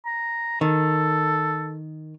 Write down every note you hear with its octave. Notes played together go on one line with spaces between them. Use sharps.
A#5
D#3 A4